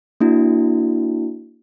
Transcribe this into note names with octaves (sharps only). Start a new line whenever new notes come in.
A#3 D4 E4 F#4